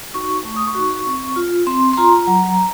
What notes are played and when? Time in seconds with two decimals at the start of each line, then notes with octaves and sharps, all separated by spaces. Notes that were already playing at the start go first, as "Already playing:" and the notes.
0.14 D#4 F#4 C#6
0.45 A3 C#6
0.56 D#6
0.67 C#6
0.75 D#4 F#4
1.06 C4
1.36 F4
1.67 C4 C6
1.93 C6
1.97 F4 A#5
2.27 F#3